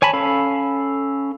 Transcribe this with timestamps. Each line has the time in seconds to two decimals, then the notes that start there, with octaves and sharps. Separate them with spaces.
0.02 C#5 G#5 A5 B5
0.13 C#4 A4 F5 B5